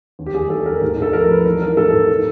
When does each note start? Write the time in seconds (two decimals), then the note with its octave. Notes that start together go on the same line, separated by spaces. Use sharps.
0.19 D#2
0.26 G4
0.34 D#2 G#4
0.50 D#2 A4
0.66 D#2 A#4
0.81 G#2
0.97 G#2 A4
1.13 F3 A#4
1.29 F3 B4
1.46 E3 A#4
1.61 E3 A#4
1.77 G#2 A4
1.93 G#2
2.08 B2